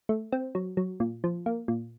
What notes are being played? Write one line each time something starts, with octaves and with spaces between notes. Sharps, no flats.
A3
C4
F#3
F#3
A#2
F3
A#3
A#2